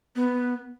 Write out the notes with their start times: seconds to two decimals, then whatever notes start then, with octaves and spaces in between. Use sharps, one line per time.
0.16 B3